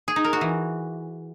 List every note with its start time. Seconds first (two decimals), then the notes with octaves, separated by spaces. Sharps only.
0.08 G#4
0.16 D#4
0.24 A#4
0.33 F#4
0.41 E3